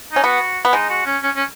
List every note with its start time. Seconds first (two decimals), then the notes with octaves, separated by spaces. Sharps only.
0.12 C#4 D#4
0.24 B3 F#4
0.65 B3
0.73 G#3 D#4
0.90 F#4
1.06 C#4
1.23 C#4
1.36 C#4